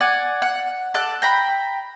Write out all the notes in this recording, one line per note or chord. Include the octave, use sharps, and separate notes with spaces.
D5 F#5 G#5
F#5
A4 D5 F#6
G5 A#5 B5